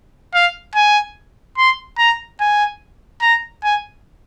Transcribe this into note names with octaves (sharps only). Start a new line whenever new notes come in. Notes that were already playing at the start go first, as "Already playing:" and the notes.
F5
G#5
C6
A#5
G#5
A#5
G#5